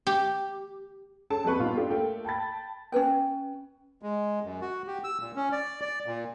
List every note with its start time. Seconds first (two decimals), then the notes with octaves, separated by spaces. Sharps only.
0.07 G4
1.30 C#4 G#4 A4 A5
1.44 F2 G3 B4 C#6
1.59 G2 A#2 B3 D#4 F4
1.77 D4 F4 G4 A4
1.91 A3 A#3 G5
2.25 G5 A5 B5 A6
2.92 C#4 A#4 B4 G5
4.02 G#3
4.44 F#2
4.61 F#4
4.87 G4
5.04 E6
5.21 A#2
5.36 C#4
5.52 D5
5.82 D5
6.06 A#2